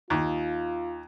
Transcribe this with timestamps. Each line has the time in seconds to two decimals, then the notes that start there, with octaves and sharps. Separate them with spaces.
0.10 D#2 F4